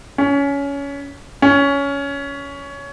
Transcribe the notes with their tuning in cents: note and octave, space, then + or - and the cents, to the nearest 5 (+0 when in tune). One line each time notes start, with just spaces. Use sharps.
C#4 +20
C#4 +15